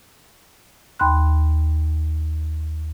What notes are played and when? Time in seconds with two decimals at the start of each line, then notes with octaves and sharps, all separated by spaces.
0.99 D#2 G5 B5 C6 F#6